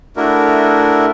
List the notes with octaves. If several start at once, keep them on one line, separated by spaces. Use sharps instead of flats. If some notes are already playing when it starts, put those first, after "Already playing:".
A3 D4 E4 F#4 A#4